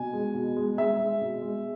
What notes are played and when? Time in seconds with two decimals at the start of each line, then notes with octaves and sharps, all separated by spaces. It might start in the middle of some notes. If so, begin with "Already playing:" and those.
Already playing: B2 G#5
0.13 G#3
0.34 B2
0.57 G#3
0.77 G#3 E5
0.99 G#3
1.21 B2
1.42 G#3